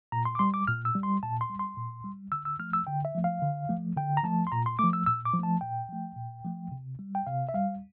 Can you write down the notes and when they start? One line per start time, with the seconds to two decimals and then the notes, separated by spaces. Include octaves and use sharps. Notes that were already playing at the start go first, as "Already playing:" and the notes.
0.12 A#2 A#5
0.25 C6
0.35 D6
0.39 G3 C6
0.54 D6
0.67 A#2 F6
0.85 E6
0.95 G3
1.03 C6
1.23 A#2 A5
1.41 C6
1.50 G3
1.59 C6
1.77 A#2
2.04 G3
2.32 D3 E6
2.45 E6
2.59 F3 A3 F6
2.73 E6
2.87 D3 G5
3.05 E5
3.15 F3 A3
3.24 F5
3.42 D3
3.69 F3 A3
3.97 D3 G5
4.17 A#5
4.24 F3 A3 A5
4.47 C6
4.52 A#2 A#5
4.66 C6
4.79 F3 A3 D6
4.93 E6
5.06 A#2 E6
5.25 D6
5.34 F3
5.39 A3 A5
5.61 A#2 G5
5.89 F3 A3
6.16 A#2
6.44 F3 A3
6.72 C3
6.99 G3
7.15 G5
7.27 C3 F5
7.49 E5
7.54 G3 F5